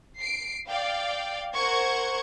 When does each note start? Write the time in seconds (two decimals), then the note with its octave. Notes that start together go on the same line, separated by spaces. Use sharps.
0.21 C7 D7
0.68 D5 F5 G5
1.55 A#4 C5 F#5 C#6 G#6